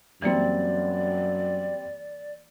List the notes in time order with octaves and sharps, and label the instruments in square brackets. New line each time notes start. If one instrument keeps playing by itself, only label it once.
[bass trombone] F#2 [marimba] E3 A#3 [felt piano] G3 C4 [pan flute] D5